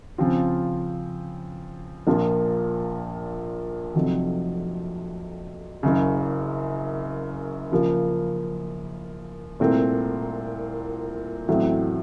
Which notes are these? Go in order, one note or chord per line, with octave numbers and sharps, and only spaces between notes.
C#3 F3 C4 F4
A#1 A#2 F3 A#3 F4
F1 F2 C3 F#3 C4
F#1 F#2 C#3
C#3 F3 A#3 F4
C2 A#2 A3 C4
A1 A2 F#3 C4